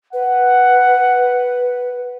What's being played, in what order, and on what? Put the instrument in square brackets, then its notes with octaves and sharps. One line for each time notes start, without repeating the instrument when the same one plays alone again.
[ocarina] B4 [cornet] F#5